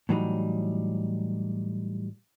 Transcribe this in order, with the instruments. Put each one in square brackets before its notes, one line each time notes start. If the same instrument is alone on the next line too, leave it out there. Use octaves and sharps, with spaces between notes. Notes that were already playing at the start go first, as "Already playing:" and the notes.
[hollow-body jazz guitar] A2 E3 F#3 G3 B3 D#4